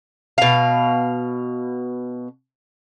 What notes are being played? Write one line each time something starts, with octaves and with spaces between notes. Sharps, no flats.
B2 F5